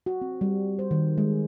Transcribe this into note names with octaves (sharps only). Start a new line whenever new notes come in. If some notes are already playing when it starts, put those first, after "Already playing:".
F#4
C4
G3
C5
D#3
G#3